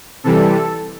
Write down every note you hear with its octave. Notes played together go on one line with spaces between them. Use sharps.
C3 E3 G3 A4